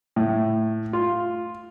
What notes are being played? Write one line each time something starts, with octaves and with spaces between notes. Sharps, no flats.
A2
F4